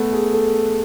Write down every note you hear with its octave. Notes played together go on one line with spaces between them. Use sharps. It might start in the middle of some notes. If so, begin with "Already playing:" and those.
Already playing: A3 B3
G#4
A4